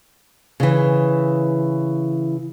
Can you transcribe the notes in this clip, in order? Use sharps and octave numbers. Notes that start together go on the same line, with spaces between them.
C#3 E3